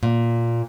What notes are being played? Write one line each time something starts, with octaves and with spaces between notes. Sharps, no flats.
A#2